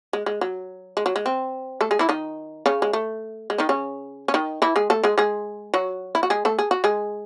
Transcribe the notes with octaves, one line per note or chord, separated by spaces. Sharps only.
G#3
G#3
F#3
G#3
F#3
G#3
C4
A3 A4
G#3 G#4
E3 E4
D#3 D#4
C#3 C#4
G#3
A3
G#3
D#3 D#4
C#3 C#4
C#4
D#3 D#4
E3 E4
G#3 G#4
A3 A4
G#3 G#4
G#3 G#4
F#3 F#4
E4
F#4
G#3 G#4
A3 A4
G#4
F#4
G#3 G#4